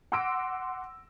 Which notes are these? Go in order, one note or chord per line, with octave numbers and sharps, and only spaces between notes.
F#5 C6 D6 E6 A#6 D7